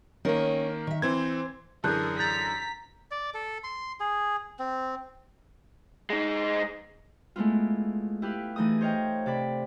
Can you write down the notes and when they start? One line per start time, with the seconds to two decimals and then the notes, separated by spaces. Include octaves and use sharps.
0.25 D#3 A#3 C#4 A#4
0.87 D#3 E5
1.02 E3 C4 C5 G#6
1.84 F#2 D3 E3 G#4 A#4 A5 F#6 G6
2.19 A#5 G6 A6 B6 F#7
3.11 D5
3.34 A4
3.64 C6
4.00 G#4
4.59 C4
6.10 G#3 D#4
7.36 G#3 A3 B3 E4 F4
8.22 E4 G4 B4 F5
8.56 E3 A3 D#4 G#4 D#6
8.81 C5 C#5 D#5 F5 G5
9.26 C3 D5 B5